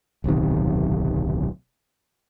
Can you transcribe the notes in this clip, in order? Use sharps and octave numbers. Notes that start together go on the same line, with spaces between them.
D1 B1 C3 D#3